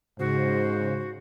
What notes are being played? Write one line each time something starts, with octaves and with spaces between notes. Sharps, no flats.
G#2 C#3 F#4 C5